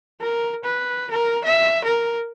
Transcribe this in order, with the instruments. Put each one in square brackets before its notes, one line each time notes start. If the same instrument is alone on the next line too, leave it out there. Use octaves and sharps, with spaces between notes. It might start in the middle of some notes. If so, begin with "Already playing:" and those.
[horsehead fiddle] A#4
B4
A#4
E5
A#4